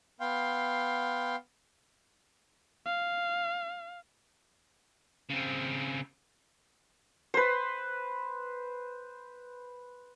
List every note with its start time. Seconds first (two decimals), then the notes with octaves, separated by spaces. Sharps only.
0.20 B3 F5 G5 C6
2.86 F5
5.30 C#3 C4
7.34 B4 C5